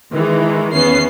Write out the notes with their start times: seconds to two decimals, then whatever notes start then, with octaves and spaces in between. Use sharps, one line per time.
0.12 D#3 E3 G#3
0.74 E2 B3 C#4 C7